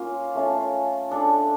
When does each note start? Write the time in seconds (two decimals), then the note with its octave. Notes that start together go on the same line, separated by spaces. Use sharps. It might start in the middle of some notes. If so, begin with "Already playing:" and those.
Already playing: A#3 C#4 F4
0.35 A3 C#4 F4
1.11 D4 A4 D5